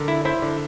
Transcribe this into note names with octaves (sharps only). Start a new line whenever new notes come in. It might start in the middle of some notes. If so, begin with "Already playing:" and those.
Already playing: D3 A#4 D5
E4
E4 C5 E5
D3